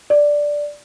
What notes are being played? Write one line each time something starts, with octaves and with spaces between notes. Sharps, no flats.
D5